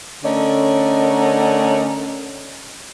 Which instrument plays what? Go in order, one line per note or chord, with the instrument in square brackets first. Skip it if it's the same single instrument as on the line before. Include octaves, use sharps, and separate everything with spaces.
[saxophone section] D3 A3 C#4 A#4 D5 D#5